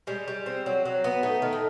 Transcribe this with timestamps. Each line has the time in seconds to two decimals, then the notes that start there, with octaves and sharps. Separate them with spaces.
0.07 G3 G#3
0.28 G3
0.46 C4
0.66 F#3
0.85 F#3
1.04 B3
1.23 A3 D#4
1.42 D#3
1.53 A3